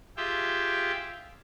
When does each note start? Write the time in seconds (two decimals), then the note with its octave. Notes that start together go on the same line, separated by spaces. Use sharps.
0.17 F4 G4 G#4 E5 G5